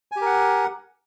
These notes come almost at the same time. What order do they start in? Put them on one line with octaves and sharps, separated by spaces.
G#5 G4 A#4 F#5